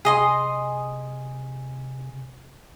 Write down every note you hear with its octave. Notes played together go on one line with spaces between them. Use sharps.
C3 G#4 D#5 C6